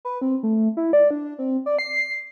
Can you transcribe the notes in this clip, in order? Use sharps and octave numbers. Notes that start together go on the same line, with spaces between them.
B4
C4
A3
E4
D5
D4
C4
D5
C7